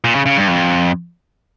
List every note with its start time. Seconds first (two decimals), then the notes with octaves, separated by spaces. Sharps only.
0.04 A#2
0.15 C#3
0.26 C#3
0.37 G2
0.48 F2